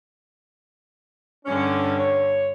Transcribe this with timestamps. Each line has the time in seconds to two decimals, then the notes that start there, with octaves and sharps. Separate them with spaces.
1.46 G2 D3 C#4
1.99 C#5